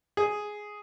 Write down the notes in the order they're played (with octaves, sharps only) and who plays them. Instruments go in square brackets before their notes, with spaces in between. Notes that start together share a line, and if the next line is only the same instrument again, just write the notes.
[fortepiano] G#4